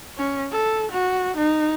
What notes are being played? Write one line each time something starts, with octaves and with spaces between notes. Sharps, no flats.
C#4
A4
F#4
D#4